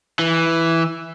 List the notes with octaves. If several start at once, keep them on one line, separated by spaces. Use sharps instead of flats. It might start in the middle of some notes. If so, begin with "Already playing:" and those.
E3